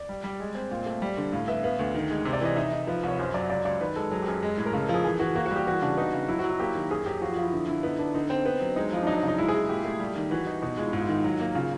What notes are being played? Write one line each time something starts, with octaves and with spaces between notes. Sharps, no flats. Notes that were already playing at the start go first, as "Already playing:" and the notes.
Already playing: D5
G3
G3
G#3
C4
A#2
A3
G3
D3
A2 F5
B3 E5
B3 F5
D2
D#3
G#3
C3
D5
E3 D#5
D#4 E5
D#4
F3 B4
C2
C#5
F#2 C5
F#3 D5
C#2 D5
C#2 D5
D#3 B4
G#3 A4
F#3 G#4
G4
F#2 G#4
G#3
A2
A#4
C#3 A4
A4
F3 G#4
E3 G#4
E3 F#4
A#3 F#4
F#4
G3
G4
E3 F#4
C#3 D4
B3 D#4
C#3
F#3 E4
F#4
F#3
F#4
A#3 G4
D#3
F#2 G#4
F#3 G4
F3 F#4
F4
F3
E4
D3 E4
D3 E4
B3 D#4
B3 D4
D3 D#4
C4
B3
F#3
G#3 D#4
F3 D#4
D4
F#3 D#4
D#4
C#3
D#4
G#3 E4
G#4
G#3
A#2 G4
A3
G3
D#3
E3 F#4
E3 D#4
B2 D#4
G#3 F4
E4
G#2 F4
D#3
F#3
A#3
C#3 F4